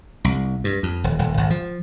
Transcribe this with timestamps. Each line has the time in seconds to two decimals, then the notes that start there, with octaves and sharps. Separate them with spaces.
0.24 C2
0.64 G2
0.83 F2
1.04 D#1
1.19 D#1
1.37 G#1
1.50 F3